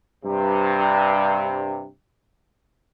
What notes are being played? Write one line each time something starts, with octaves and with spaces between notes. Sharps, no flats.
G2 C3